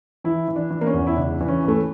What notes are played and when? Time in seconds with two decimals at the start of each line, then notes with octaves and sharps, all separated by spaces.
0.24 E3 E4
0.48 E3
0.56 D4
0.71 E3
0.81 A#3
0.86 C#4
0.94 E2
1.07 E4
1.17 C#2 D4
1.40 E3
1.48 C#4
1.64 E3 A3